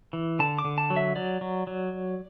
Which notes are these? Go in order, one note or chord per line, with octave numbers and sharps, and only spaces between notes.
E3
D3 A5
D6
D3
A5
F#3
E5
F#3 D5
F#3
F#3